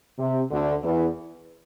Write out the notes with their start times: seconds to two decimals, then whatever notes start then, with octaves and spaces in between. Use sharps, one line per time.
0.18 C3
0.50 D2 D3
0.83 E2 E3